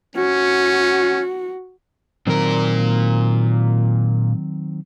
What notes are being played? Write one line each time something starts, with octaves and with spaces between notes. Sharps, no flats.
C#4 F#4
A#2 D#3 F#3 C4 A#4